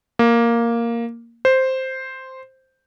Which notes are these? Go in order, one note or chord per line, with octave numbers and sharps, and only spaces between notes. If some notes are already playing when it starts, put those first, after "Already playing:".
A#3
C5